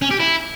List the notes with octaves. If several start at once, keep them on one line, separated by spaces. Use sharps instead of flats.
C#4
G4
E4